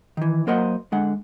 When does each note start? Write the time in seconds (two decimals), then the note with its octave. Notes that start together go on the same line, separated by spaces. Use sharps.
0.17 D#3 E3
0.47 F#3 A#3 A#4 C5 D#5 F#5
0.92 D3 G#3 F#5